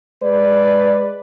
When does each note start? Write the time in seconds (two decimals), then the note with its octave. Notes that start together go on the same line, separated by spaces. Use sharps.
0.22 G#3 B4 D5